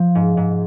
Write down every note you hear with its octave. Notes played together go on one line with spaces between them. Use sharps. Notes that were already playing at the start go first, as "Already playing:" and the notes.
Already playing: F3
G#2
G#2